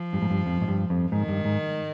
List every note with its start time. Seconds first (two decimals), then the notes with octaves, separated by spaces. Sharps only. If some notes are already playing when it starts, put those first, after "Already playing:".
Already playing: F3
0.13 G2
0.22 G#2
0.30 G2
0.46 F2
0.61 G#2
0.68 G2
0.90 F2
1.12 G#2 D#3
1.29 G2
1.45 G#2